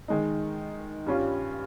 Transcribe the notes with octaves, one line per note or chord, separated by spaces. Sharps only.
D#3 G#3 D#4
G2 G3 C#4 F4